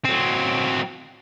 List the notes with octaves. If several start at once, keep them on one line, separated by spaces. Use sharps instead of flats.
F#3 C4